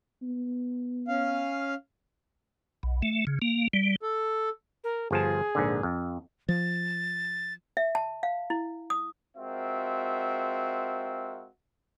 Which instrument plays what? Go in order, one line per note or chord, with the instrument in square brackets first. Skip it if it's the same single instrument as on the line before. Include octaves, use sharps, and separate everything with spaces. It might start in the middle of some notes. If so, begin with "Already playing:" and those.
[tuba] B3
[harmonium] C#4 F5
[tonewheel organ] B1
A3
C#3
A#3
G3
[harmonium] A4
[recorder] A#4
[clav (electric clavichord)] G1 F3 A5 [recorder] G#4
[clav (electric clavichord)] A#1 G#2 D3
F2
[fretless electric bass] F3 [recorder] A6
[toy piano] E5
A5
F5
E4
D#6
[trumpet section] G#3 C4 F4 F#4 A#4 E5